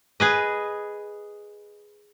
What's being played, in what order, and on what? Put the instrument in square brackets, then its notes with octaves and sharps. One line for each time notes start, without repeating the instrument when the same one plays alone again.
[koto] G#4 B4 D#5